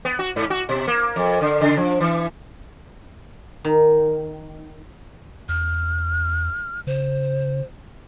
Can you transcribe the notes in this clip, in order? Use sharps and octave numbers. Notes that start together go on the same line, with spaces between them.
B3
F#4
G#2
F#4
B2
A#3
F2
D3
C#3
F3
E3
D#3
E2 F6
C#3 C5